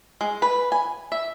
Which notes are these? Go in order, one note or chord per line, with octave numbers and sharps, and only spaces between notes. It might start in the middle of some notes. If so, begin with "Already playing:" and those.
G#3
B4
G#5
E5